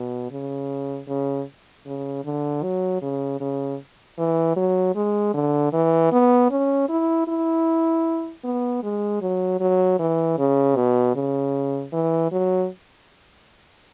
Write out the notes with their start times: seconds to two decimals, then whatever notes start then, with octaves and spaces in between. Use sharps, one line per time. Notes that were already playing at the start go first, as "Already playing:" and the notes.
Already playing: B2
0.31 C#3
1.08 C#3
1.85 C#3
2.24 D3
2.63 F#3
3.02 C#3
3.40 C#3
4.18 E3
4.56 F#3
4.95 G#3
5.34 D3
5.73 E3
6.12 B3
6.50 C#4
6.89 E4
7.28 E4
8.44 B3
8.83 G#3
9.21 F#3
9.60 F#3
9.99 E3
10.38 C#3
10.76 B2
11.15 C#3
11.93 E3
12.32 F#3